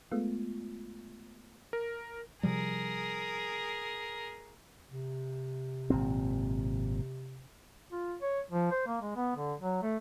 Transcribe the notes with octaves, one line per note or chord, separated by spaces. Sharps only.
G#3 A3 B3 F4
A#4
C3 F3 G3 G#4 A#4
C3
G#1 A#2 C4
F4
C#5
F3
C5
A#3
G#3
B3
D3
F#3
A3